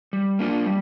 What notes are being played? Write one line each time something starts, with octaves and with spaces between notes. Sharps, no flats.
G3
A#3 D4 F4
G3